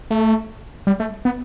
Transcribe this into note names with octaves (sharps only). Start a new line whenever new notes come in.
A3
G3
A3
B3